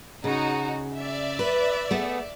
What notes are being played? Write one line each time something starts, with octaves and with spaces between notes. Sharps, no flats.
C#3 D#4 F#4
D5 E5
B4
A3 B3 G#4